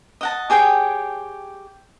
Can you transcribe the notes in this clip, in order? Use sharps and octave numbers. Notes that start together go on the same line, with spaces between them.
D#5 F#5 A5
G4 G#4 C#5 G5